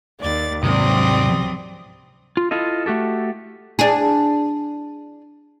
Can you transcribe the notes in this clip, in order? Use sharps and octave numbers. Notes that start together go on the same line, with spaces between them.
D#2 D5 A6
D#2 G#2 C3 F#3 G3 C4 D5 D#6
F4
E4 F4 A4 D#5
A3 F#4 G4 A4
D4 G#4